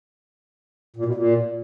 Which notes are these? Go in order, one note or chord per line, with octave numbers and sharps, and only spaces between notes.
A#2
B2
A#2